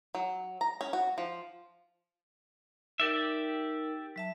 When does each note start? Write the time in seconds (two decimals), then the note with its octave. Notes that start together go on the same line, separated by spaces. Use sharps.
0.15 F#3
0.61 A#5
0.81 C#4
0.93 F#4
1.18 F3
3.00 D#4 G4 A#4 D5 E5
4.16 F#3 E5 A5